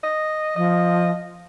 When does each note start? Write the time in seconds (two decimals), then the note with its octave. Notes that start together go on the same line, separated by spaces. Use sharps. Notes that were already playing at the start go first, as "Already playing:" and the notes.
0.03 D#5
0.56 F3 D#5